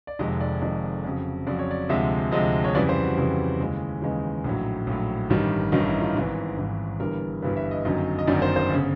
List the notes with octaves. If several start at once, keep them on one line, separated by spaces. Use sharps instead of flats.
D5
F1 F2 C3 D#3 G#3 D#5
D5
F1 F2 C3 D#3 G#3
F2 C#3 F#3
F2 C#3 F#3 D5
C#5
D5
D2 C3 F3 G#3 E5
D2 C3 F3 G#3 D#5
C#5
F2 C#3 E3 G3 D5
C5
F#4
F2 C#3 E3 G3
D#2 C#3 E3 G#3
D#2 C#3 E3 G#3 D#4
A#1 A2 F#3
A#1 A2 F#3
A1 G2 D#3 G3
A1 G2 D#3 G3 D#4
E4
F4
G#1 G#2 E3
G#1 G#2 E3
G1 G2 E3 G3 A#4
G1 G2 E3 G3 B4
E5
D#5
G1 F#2 D#3 F#3 D#5
D#5
G1 F#2 D#3 F#3 D5
C5
C5
G1 C#3